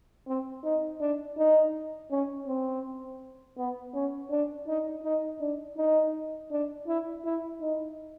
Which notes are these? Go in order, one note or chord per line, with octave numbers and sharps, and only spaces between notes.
C4
D#4
D4
D#4
C#4
C4
B3
C#4
D4
D#4
D#4
D4
D#4
D4
E4
E4
D#4